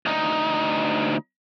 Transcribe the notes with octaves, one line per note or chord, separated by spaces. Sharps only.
D2 D#4